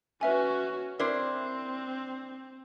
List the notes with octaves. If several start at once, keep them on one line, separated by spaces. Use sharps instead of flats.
C#4 F#4 B4 E5 G#5
C4 D4 E4 A#4 C5